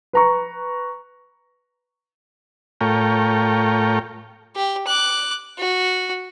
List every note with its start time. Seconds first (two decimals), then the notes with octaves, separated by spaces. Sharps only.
0.13 B4 A#5 C#6
2.81 A2 A3 F4 A#4 C#5 G5
4.55 G4
4.87 D6 F#6
5.58 F#4